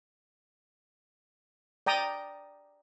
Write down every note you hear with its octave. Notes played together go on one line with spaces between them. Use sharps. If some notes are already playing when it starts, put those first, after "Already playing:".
D5 G5 A#5 D#6